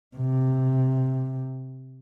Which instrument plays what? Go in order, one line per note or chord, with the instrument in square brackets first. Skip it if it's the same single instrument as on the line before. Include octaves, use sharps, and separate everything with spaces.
[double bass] C3